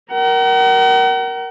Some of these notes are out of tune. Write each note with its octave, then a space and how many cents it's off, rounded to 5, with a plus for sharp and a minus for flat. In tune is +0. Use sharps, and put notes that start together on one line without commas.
A#4 +10 F#5 +45